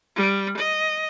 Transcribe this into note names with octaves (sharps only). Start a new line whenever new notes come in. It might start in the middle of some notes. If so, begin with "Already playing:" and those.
G3
D#5